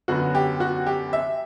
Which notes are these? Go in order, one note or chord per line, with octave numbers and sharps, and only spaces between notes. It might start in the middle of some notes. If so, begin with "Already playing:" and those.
F#2 D3 F#3 B3 F#4
G4
F#4
G4
E5